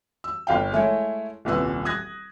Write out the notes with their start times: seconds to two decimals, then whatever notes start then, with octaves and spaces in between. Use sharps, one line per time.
0.24 E6
0.47 G1 F5 G5
0.72 G#3 A3 E4 C#5
1.45 D#1 C2 A#2 B4 E6
1.85 D#6 F#6 G#6 A#6